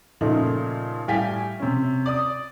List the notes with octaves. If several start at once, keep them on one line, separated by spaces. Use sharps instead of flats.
A#2 C#3 F3 A3 D#4
A2 G3 F5 G5 G#5 B6
C3 C#4
D5 D#6